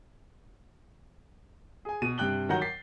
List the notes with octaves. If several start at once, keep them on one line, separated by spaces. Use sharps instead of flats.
G#4 G#5
B2 D#7
G2 C3 G5 F#6 F#7 G7
D#3 F#3 F#5 A#5 G6 G7
A6 B6 C7